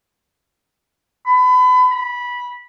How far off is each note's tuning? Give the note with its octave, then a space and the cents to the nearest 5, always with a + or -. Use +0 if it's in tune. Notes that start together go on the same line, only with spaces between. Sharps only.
B5 +30
B5 -15